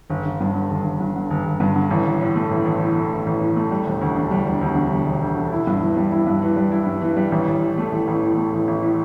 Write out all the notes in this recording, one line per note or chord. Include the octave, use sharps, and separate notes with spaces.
G1
G1
G2
D3
G1
G1
G2
D3
G1
G1
G2
D3
A1
A1
A2
A3
A1
A1
A2
A3
A1
A1
A2
A3
G3
E1
D2
D3
G3
E1
D2
D3
G3
E1
D2
D3
E4
G2
E3
G3
E4
G2
E3
G3
E4
G2
E3
G3
A1
A1
A2
A3
A1
A1
A2
A3
A1
A1
A2